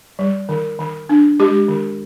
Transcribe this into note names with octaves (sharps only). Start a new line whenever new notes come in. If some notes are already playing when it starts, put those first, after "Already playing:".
G3
D#3
D#3
D4
G#3 G4
D#3